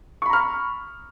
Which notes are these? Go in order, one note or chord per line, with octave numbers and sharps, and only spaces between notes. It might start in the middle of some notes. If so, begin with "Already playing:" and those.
A#5 B5 C#6 F6